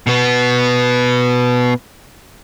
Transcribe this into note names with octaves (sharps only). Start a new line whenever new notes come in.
B2 B3